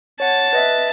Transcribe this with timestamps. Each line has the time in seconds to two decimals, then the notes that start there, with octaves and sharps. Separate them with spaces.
0.20 C#5 F#5 A5
0.53 B4 D#5 E5